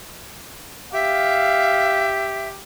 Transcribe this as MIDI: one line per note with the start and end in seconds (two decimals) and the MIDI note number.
0.94 2.62 67
0.94 2.49 76
0.94 2.12 77